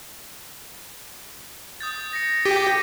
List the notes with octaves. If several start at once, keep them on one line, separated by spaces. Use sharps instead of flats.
D#6 G6 A6
A#6 C#7
G4 A6 B6 D#7